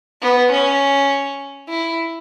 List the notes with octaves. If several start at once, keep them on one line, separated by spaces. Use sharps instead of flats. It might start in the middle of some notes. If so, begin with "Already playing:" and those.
B3
C#4
E4